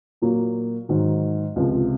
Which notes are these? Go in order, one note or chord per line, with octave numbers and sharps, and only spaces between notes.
A#2 F#3 A#3
G#2 D#3 F#3
C#2 C3 F3